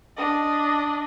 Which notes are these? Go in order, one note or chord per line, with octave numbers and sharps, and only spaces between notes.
D4 D#5